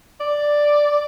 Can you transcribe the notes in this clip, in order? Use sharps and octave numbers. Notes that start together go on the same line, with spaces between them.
D5